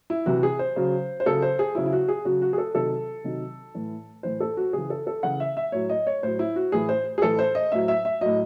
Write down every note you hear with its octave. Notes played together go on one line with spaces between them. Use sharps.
E4
C3 E3 F#4
G#4
C5
C#3 F#3
C5
C#3 F#3 A4
C5
G#4
C#3 F#3 E4
E4
F#4
G#4
C#3 F#3 F#4
F#4
G#4
A4
C3 D#3 F#3 A4
C3 D#3 F#3
A2 E3
A2 E3 C5
A4
F#4
C#3 E3 G#4
A4
A4
C#3 E3 F#5
E5
E5
A2 F#3 C#5
D#5
C#5
A2 F#3 C5
E4
F#4
A2 E3 G#4
C5
G#4
A2 E3 A4
C5
D#5
A2 F#3 E5
E5
E5
A2 F#3 D#5